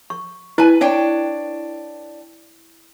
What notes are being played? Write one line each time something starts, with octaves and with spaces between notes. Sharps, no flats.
C#6
E4 B4 G#5
D4 C#5 G5